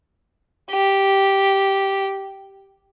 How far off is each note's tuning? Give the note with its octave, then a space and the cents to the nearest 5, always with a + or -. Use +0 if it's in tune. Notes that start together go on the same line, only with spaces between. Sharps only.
G4 -5